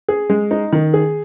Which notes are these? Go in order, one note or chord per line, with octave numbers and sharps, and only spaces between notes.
G#4
G#3
D#4
D#3
G#4